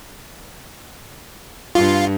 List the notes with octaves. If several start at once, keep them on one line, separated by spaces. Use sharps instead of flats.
G2 F4